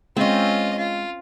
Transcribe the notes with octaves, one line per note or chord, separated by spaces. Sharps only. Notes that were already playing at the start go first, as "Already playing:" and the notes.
G#3 C4 C#4 F4 D#5
F4